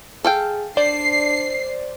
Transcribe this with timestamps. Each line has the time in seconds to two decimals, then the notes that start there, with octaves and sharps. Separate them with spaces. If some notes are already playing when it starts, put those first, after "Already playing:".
0.24 G#4 A4 F5 G5
0.77 D4 C5 D5 C7